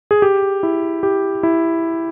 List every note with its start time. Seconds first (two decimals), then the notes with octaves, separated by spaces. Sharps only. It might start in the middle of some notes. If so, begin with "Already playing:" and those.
0.11 G#4
0.22 G4
0.63 E4
1.03 G4
1.43 E4